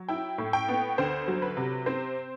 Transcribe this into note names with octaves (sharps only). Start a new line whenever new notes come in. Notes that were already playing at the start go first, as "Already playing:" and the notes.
Already playing: F#3
E4 G5
A2
G5
B3
D2 C5
F#3
B4
C3
C4 C5